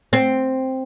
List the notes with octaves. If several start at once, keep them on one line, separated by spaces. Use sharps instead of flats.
C4